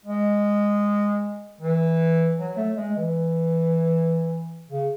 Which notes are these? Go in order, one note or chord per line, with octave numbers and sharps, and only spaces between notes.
G#3
E3
F#3
A3
G#3
E3
C#3